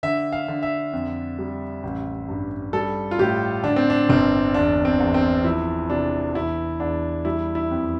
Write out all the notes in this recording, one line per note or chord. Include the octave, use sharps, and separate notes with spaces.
D3 E5
F5
D3
E5
F2
G3
A1
G2
G3 A4
F4
A2 G4
D3 D4
C4
D4
G1 C4
E2 D4
C4
E2
C4
F3 E4
C3 D4
E2 E4
E2 D4
G3 E4
E4
F2